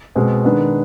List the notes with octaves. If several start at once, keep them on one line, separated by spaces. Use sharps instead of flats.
B2 G#3 C4
D#3 G#3 B3 D4